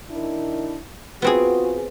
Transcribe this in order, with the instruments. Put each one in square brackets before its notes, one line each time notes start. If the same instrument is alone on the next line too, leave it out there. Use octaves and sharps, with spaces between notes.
[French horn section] D#3 D4 E4
[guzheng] B3 C4 G#4 [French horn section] F4 F#4